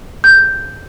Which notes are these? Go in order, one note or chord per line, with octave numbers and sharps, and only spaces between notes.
G6